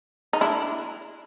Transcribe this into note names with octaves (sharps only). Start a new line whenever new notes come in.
D#4
D4 E4